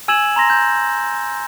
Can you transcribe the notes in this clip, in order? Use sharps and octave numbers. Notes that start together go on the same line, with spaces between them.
G#5 E6 G#6 E7 F#7
A#5 C6 A#6
G6